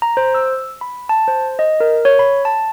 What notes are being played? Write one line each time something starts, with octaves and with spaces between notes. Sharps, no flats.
A#5
C5
E6
B5
A5
C5
D#5
A#4
C#5
B5
A5